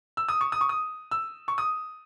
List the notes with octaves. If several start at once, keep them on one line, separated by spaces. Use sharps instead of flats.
E6
D#6
C#6
D#6
C#6
D#6
E6
C#6
D#6